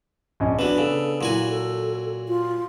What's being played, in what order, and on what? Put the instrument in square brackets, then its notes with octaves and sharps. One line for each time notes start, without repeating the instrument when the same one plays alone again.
[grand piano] A#1 C#4 D#5
[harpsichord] E3 F#3 [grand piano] B3 D4
[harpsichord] C#3 [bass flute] A4
[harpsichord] A#2 F#4 G#5 [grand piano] F#3 [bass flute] E4
[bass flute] A4
F4